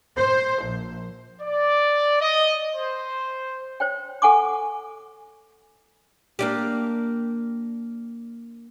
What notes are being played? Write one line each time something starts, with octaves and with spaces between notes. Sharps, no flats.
C5
A#1
D5
D#5
C5
C5 C#5 G5
A4 F#5 G#5 C#6 D6
A#3 D4 G4